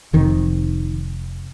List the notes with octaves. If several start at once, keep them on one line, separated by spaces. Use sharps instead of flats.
F1 F2 C3 D#3